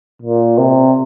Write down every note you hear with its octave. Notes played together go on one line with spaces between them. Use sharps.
A#2
C3